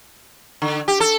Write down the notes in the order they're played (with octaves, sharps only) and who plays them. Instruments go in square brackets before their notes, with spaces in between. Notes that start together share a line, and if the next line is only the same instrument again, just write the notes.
[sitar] D3
G4
A4